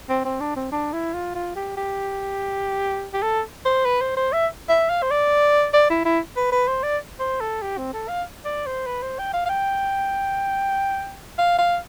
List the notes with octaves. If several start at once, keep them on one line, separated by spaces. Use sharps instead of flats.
C4
C4
D4
C4
D4
E4
F4
F4
G4
G4
G4
A4
C5
B4
C5
C5
E5
E5
F5
C5
D5
D5
E4
E4
B4
B4
C5
D5
C5
A4
G4
C4
A4
F5
D5
C5
B4
C5
G5
F5
F5
G5
F5
F5